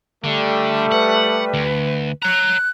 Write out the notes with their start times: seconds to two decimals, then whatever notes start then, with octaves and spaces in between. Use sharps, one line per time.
0.24 D3 G3 A3
0.92 B4 F#5
1.54 D2
2.23 C#5 A#5 F#6